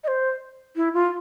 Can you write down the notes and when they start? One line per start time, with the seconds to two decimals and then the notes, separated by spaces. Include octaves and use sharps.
0.04 D#5
0.08 C5
0.76 E4
0.94 F4